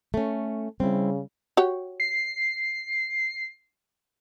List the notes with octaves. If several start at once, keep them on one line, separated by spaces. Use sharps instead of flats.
A3 C#4
C#3 G3 C4 E4
F#4 G4 C#5
C7